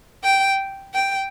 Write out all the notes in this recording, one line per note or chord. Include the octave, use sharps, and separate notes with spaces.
G5
G5